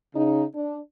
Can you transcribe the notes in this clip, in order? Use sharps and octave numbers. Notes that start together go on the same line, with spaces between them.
C#3 D#4
D4